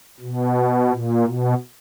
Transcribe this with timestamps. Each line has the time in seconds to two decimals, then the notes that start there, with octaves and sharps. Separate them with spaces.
0.20 B2
0.89 A#2
1.24 B2